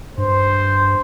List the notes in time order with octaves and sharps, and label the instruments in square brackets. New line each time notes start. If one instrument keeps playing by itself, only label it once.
[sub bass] G2 [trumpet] C5